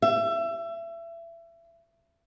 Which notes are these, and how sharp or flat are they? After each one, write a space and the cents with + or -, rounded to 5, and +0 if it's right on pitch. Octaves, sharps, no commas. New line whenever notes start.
E5 +30